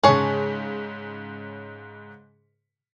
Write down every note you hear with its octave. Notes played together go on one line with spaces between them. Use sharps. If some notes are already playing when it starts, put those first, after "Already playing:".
G#2 C#3 G#4 C#5 A5